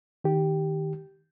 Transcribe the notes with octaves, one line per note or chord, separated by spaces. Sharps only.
D#3 G4